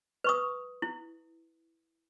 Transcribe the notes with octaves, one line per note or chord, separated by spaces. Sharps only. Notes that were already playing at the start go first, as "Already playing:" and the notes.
B4 C#6 D#6
E4